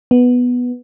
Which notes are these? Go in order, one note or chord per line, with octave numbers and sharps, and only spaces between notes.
B3